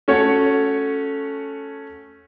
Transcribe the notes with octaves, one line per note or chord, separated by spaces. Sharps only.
A3 C#4 F#4 C#5